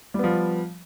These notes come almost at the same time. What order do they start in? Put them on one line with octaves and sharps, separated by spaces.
G3 B3 F3